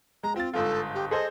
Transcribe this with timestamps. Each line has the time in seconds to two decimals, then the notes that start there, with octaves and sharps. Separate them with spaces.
0.23 G#3 A#5
0.36 C4 F4 A6
0.54 G1 G#2 F4 A4
0.95 G4
1.11 G#4 A4 C5 D#5